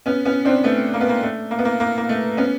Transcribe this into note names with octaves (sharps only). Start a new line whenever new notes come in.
B3 C#4
B3 C#4
C4 D4
A3 B3
A#3
B3
A#3
A3
A#3
B3
A#3
A#3
A#3
A3
B3 C#4